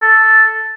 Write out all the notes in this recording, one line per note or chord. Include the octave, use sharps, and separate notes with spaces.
A4